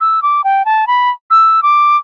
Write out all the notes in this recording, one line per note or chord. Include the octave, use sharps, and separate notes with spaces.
E6
D6
G5
A5
B5
E6
D6